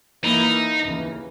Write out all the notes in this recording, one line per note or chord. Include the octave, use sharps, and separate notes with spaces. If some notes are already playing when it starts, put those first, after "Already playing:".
E3 A#3 D#4 E4
D#2 C#3 E3 A#3